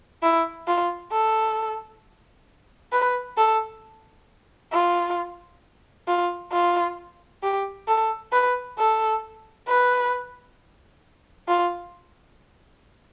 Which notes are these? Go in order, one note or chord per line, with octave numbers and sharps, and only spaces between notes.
E4
F4
A4
B4
A4
F4
F4
F4
G4
A4
B4
A4
B4
F4